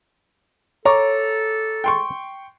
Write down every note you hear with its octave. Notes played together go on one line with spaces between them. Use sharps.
A4 C#5 A#5 C#6 D6
G5 C6 C#6